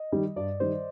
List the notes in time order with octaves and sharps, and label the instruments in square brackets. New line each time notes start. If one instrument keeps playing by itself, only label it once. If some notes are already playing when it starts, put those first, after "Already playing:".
Already playing: [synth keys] D#5
[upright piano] D#3 G3
[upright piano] G2 [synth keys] D5
[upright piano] D#3 G3 [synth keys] C5